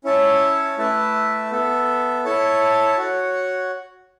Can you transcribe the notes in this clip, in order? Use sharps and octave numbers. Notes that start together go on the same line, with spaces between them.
C#4 E4 C#5 E5 A5
A3 E4 B4 E5 A5
B3 A4 E5
E4 A4 C#5 A5
F#4 C#5 F#5